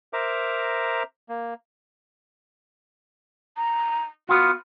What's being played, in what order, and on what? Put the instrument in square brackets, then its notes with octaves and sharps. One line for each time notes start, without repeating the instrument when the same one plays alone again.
[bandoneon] A#4 C5 E5 A#5 D6
A#3
[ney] A#5
[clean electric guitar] B3 F4 [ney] F#4